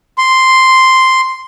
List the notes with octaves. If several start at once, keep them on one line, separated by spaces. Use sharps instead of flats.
C6